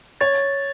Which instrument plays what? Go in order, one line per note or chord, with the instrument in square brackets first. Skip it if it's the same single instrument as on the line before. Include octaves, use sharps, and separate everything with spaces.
[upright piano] C#5 [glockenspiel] A6